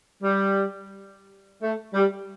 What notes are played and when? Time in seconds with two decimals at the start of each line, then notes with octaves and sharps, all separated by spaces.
0.22 G3
1.63 A3
1.94 G3